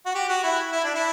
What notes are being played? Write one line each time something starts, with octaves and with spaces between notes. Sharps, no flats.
F#4
G4
F#4
E4
E4
D4
E4